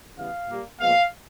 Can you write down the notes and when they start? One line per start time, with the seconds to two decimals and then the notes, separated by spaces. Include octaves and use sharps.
0.16 C#3 E3 G3 B3 F5
0.47 A#2 G3 A#3
0.79 A#2 F3 G#3 B3 F5